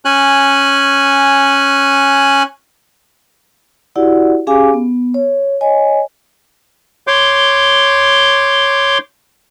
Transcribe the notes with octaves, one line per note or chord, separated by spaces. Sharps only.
C#4 G#5 F#6
E4 F#4 G4 D5 F#5
C#4 G4 G#4 F5 G#5 D6
B3
C#5
C#5 D#5 G#5
C#5 C6 D6 G6